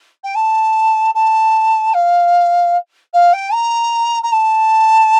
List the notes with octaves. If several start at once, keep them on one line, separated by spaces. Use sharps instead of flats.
G5
A5
A5
F5
F5
G5
A#5
A#5
A5